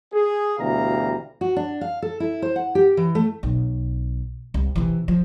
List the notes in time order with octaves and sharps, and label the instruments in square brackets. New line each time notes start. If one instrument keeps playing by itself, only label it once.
[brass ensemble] G#4
D2 B2 E3 G3 F5 A#5
[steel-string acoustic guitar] F#4
D4
F5
A4
E4
C5
F#5
G4
E3
A3
[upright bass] B1
C2
C3 E3
F3